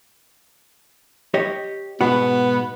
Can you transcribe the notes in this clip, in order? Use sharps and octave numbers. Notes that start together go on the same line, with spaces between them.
G4 C#5 D#5
G#2 B2 B3 F#4